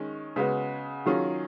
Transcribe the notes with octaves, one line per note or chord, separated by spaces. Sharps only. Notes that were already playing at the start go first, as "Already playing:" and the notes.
Already playing: D#3 G#3 C#4
C#3 G#3 B3 F#4
D#3 F#3 C#4 F4 G#4